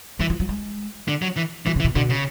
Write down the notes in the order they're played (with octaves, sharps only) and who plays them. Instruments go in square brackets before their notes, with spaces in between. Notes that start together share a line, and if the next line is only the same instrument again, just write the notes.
[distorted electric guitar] E3 [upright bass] F#3
[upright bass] E3
F#3
G#3
[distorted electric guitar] D3
F#3
E3
[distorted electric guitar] E3 [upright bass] F#3
[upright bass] C#3
[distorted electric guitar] E3
[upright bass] B2
[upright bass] B2 [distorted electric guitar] D3
[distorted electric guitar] C#3